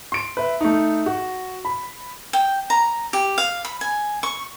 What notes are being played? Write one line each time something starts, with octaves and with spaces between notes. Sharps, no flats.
C6 D7
B4 E5
A3 D#4
F#4
B5
G5
A#5
G4
F5
B5
G#5
C#6